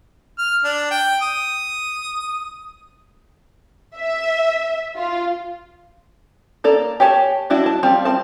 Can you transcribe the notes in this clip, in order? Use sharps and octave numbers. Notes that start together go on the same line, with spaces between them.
F6
D4
G5
D#6
E5
F4
A#3 A4 D5 A#5
G4 C#5 G#5 A5
G3 D4 E4 F#4
A5
G3 C4 F4
C4 A5